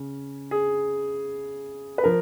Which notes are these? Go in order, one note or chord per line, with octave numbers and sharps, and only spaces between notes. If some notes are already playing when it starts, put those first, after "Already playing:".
Already playing: C#3
G#4
B4
F3 A#4